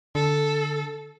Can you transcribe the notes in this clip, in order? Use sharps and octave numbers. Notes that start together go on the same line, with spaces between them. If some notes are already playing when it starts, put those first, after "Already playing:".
D3 A4